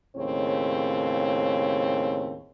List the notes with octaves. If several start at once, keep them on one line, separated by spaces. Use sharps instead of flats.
D#2 A2 C#3 C4 C#5